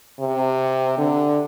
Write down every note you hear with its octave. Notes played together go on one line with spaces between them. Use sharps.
C3
D3